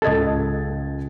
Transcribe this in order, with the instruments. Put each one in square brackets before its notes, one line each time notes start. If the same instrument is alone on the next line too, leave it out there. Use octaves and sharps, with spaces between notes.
[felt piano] C#2 G#6 A6 [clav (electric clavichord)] A4 D#5